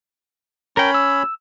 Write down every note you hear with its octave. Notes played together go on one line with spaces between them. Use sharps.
C#4 A#4 C#5 G5 B5
E6